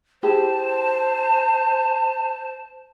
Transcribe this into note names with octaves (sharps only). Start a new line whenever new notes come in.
E4 G4 G#4 C5 A5